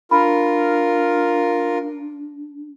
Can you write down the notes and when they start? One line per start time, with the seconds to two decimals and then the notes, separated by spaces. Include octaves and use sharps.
0.11 D4 F4 A#4 B5